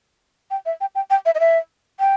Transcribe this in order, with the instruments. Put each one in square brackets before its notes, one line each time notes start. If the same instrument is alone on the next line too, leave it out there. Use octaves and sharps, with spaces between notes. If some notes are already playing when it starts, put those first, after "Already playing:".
[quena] G5
E5
G5
G5
G5
E5
D#5
E5
G5